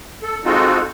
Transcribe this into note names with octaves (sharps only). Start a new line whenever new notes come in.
A4
G#3 C4 D#4 F4 F#4 A4